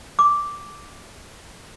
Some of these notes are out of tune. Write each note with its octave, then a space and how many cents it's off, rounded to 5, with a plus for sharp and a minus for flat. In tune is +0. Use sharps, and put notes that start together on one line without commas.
D6 -5